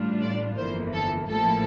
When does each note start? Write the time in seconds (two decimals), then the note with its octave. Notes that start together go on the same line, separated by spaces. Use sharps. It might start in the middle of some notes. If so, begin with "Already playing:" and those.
Already playing: A1 A2 G3 D4 F4
0.21 D5
0.57 G1 F2 E3 A#3 C5
0.93 A4
1.28 A1 A2 F3 A#3 E4 A4